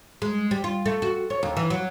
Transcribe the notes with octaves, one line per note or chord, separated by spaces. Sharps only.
G#3
G3
F4
A3
F#4
C#5
D#2
E3
F#3